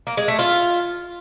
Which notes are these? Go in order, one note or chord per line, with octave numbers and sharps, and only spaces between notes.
A#3
G#3
A3
F4